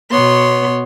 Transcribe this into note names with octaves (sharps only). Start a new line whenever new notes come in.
B2 B3 C#5 C6